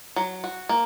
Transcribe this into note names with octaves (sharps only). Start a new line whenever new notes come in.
F#3
F#4
A#3